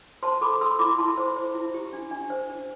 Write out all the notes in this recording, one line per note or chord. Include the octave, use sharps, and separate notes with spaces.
C5 A5 C6
A4 B5 D6
A4 C6 E6
E4 B5 D6
E4 A5 C6
C5
C5
E4
G4
D4
D4
C5
D4